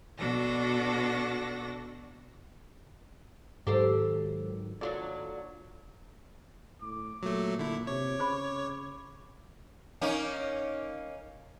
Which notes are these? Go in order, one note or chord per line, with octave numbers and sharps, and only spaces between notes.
B2 D4 F#4 A4 A#6
G#2 D#3 F#3 G4 A4 C5
D#2 F#3 D4 F4 A4 D5
A2 D6
A#2 F#3 A3
D3 E4
C3 C#5 D6
C#3 G#4 C5 B5
A#3 C#4 D#4